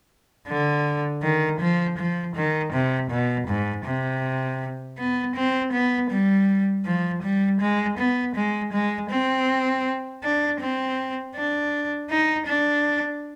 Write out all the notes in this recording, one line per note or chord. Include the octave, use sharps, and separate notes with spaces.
D3
D#3
F3
F3
D#3
C3
B2
G#2
C3
B3
C4
B3
G3
F3
G3
G#3
B3
G#3
G#3
C4
D4
C4
D4
D#4
D4